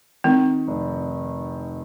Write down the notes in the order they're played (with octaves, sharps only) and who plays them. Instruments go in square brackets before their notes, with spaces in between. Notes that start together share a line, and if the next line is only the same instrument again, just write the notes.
[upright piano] D#3 [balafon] C4
[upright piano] F1